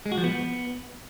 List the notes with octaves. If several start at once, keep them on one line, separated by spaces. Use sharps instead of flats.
G#3
F#4
F3
B3